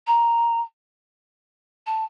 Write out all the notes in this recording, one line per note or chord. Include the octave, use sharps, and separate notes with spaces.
A#5
A5